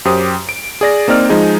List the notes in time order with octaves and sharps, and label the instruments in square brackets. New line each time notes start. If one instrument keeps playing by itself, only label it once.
[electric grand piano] F#2 G4 C5 D#6
D7
G#4 D5 A#6
A#3 C4 D#4 D5 F6
F3 G#3 D#4 G#4